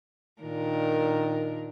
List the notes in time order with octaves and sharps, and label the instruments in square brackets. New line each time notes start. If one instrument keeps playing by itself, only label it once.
[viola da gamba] A#2 D4 A#4 [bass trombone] D#3